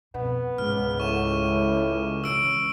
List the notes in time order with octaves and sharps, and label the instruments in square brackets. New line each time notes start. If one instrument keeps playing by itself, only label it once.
[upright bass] F2 B2 [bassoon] B3
[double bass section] C#2 [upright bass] G#2 [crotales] F6
[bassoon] A2 [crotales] C#6 E7
[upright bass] E3 C#4 [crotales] E6 D7